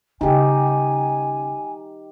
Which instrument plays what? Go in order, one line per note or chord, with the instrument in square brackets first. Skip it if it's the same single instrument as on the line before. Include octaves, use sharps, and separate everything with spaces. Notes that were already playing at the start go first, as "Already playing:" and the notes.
[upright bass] C#3 [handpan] D#4 G4 [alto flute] G#5